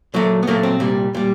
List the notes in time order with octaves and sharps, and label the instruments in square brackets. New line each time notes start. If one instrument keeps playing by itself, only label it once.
[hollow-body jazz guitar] A#2 F#3 A3
B3
A#2 F#3 A3 A#3
C4
C2 A#2 G3
A#2 G3